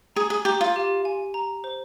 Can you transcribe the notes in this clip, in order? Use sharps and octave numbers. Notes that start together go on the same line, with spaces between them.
G#4 A#5
G#4
G4 A#5
F4
G4
G#5
A#5
C5